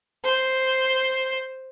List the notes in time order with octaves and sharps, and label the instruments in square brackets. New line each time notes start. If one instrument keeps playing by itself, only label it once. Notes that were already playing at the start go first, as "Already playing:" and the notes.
[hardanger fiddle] C5